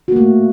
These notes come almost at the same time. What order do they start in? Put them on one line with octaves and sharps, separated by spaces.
F#4 A#3 A3